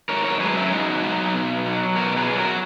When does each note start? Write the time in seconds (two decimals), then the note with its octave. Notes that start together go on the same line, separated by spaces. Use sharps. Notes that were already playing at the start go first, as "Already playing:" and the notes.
0.09 G#2 A#4 C#5
0.24 A#4 C#5
0.40 F#3 G#4 B4
0.56 C#4 E4
0.71 G#2 D#4 F#4
1.03 F#3
1.35 B2
1.66 F#3
1.96 B2 F#4 A#4
2.16 G#4 B4
2.27 F#3
2.38 F#4 A#4